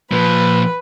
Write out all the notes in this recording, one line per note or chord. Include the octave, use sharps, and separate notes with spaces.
A#2 F3 B4